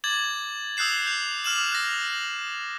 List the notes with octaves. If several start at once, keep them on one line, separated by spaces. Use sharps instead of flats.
D6 G#6 A6 F#7
D#6 E6 F#6 G6 C7 E7
G6 F7
D6 F6 E7 F#7
F#6 A#6